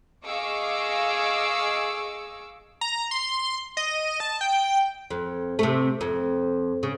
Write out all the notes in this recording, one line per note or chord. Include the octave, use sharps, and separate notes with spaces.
G#4 D#5 F5 C#6 D6 E6
A#5
C6
D#5
A5
G5
F2
C3 A3
F2
C#3